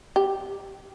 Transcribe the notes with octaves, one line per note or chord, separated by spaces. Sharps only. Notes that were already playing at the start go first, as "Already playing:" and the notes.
G4